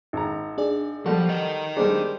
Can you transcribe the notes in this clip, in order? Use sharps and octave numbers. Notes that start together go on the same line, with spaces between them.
G#1 A#5
D4 G#4 D5
F3 G3 F#4 A4
A#4 D#5
G3 G#3 D4 G#4 C5